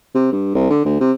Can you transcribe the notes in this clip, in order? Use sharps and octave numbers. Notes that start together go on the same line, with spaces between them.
C3
G2
C2
D3
D2
C3